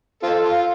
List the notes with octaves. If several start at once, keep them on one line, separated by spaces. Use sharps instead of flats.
C4 F4 A4
F4